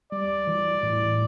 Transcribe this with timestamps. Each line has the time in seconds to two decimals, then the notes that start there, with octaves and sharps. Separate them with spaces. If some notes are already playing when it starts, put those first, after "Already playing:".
0.12 G3 D5
0.47 E3
0.83 A2